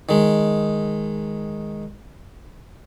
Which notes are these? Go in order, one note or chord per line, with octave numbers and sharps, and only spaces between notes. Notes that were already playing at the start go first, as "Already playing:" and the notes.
D#3 G#3